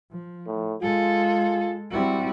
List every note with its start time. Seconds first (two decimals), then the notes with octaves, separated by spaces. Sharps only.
0.12 F3
0.46 A2
0.82 G#3 F4 G#4 A4
1.91 G3 C4 E4 F#4